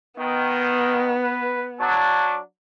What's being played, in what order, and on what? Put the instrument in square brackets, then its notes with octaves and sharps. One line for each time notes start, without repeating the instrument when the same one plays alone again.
[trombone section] D#3 [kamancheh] B3
[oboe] B4
[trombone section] F#3 D4 [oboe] A5